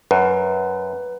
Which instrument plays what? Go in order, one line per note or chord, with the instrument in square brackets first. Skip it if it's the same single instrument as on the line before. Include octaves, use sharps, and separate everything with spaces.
[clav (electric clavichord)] F#2 [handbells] B4